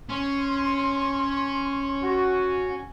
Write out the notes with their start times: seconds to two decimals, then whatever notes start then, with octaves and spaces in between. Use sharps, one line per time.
0.10 C#4 C6
2.03 F#4